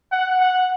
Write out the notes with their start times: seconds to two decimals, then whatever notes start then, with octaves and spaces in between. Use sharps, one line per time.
0.12 F#5
0.41 F#5